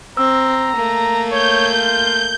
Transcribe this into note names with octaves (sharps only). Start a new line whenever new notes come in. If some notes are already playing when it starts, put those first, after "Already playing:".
C4 A#5 E6
A3 A#3
C#5 G6
F4